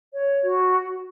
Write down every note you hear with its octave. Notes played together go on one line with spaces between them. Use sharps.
C#5
F#4